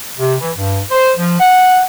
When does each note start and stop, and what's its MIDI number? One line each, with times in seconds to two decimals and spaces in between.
0.18 0.35 48
0.41 0.51 52
0.58 0.79 43
0.91 1.11 72
1.18 1.37 53
1.40 1.82 78